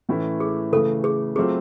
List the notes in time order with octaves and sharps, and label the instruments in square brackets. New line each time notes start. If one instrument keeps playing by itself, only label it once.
[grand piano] A2 E3 A3 C#4 E4
[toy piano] G#4
[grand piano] C#3 E3 A3 [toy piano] A4
[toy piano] G#4
[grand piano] F#3 A3 C4 F4 [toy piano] G#4